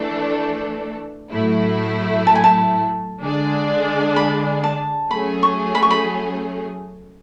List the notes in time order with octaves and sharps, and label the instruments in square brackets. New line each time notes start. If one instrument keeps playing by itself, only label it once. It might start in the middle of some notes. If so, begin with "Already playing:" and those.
Already playing: [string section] E3 A3 D4 A4 [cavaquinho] A5
[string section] A2 F#3 A3 E4
[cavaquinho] A5
G#5
A5
[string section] D3 G#3 D4 G#4 D5
[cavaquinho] B5
A5
[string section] F#3 A3 C#4 G#4 [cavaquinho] B5
[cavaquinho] C#6
B5
C#6
B5